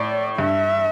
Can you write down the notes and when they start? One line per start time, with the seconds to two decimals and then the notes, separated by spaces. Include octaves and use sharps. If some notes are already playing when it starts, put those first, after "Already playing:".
Already playing: A2 D5
0.38 G2 E5